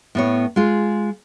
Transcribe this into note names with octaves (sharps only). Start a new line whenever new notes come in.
A2 B3 C#5
G#3 F4